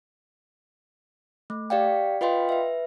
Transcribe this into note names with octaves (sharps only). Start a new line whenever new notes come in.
A3
G4 D5 F5 G5
F4 B4 D#5 F5 G5 C6
B4 E5